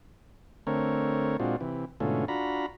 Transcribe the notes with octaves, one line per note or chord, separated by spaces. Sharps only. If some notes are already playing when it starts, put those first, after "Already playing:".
D3 A3 C4 A#4 C#5
A#2 G#3 C4 D4 F4 F#4
C3 E3
G#2 B2 D3 A3 C#4 F4
D4 F4 F#4 A#5 B5